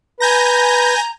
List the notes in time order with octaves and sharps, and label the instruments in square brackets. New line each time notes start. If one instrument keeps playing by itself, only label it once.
[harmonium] B4 [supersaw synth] G#5 G6 A#6 [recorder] A#5